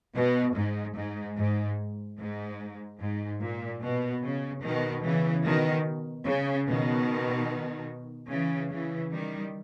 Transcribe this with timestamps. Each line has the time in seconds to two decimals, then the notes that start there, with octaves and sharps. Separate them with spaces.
0.15 B2
0.56 G#2
0.96 G#2
1.37 G#2
2.18 G#2
3.00 G#2
3.40 A#2
3.82 B2
4.23 C#3
4.63 B2 D#3
5.03 C#3 E3
5.45 B2 D#3
6.26 C#3
6.67 B2 D#3
8.29 C#3 E3
8.70 C#3 E3
9.12 D#3 G3